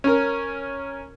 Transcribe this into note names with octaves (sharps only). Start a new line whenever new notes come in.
C#4 A#4